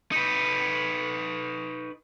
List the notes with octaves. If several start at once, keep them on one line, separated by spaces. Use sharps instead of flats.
D#4 B4